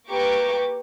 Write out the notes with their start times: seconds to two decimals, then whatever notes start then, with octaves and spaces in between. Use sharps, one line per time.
0.10 A#3 G4 B4 C#6 D6 D7